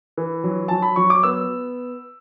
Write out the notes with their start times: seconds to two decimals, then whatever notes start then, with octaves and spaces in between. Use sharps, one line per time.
0.17 E3
0.44 F#3
0.68 F#3 A5
0.82 B5
0.96 F#3 C#6
1.10 D6
1.23 B3 E6